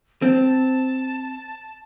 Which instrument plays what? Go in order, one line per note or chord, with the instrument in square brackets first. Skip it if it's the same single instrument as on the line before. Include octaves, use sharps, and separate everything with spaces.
[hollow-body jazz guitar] C4 [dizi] A5